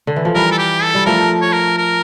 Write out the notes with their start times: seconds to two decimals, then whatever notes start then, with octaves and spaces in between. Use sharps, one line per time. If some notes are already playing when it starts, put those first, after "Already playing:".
0.07 D3
0.16 E3
0.25 F3
0.35 E3 G3 A#4
0.52 A4
0.58 G4
0.83 A4
0.95 G3
1.06 F3 A3 A#4
1.42 C#5
1.53 A#4
1.77 A#4